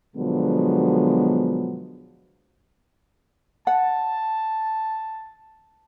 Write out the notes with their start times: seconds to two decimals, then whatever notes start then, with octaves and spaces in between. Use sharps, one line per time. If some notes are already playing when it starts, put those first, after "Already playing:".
0.17 B2 D3 F3 F#3 G#3 B3
3.67 F#5 A5